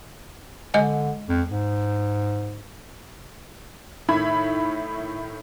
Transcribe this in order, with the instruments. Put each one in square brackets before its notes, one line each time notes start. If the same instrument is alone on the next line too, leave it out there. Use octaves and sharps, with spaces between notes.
[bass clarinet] D3 [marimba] G#3 D#5 G#5
[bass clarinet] F2
G#2
[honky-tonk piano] A2 D#3 E5 B5 G#6